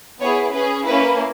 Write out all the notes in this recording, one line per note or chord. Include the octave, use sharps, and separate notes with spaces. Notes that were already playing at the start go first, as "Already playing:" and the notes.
B3 E4 G#4 C#5
C#4 G#4 B4
A#3 C#4 E4 B4